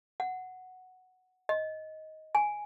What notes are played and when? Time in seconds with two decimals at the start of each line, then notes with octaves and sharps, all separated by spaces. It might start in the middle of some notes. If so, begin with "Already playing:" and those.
0.20 F#5
1.49 D#5
2.35 G#5